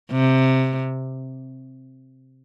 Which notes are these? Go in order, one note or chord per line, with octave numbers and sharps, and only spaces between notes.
C3